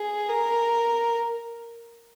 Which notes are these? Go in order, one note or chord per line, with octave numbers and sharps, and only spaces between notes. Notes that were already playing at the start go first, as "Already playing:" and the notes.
Already playing: G#4
A#4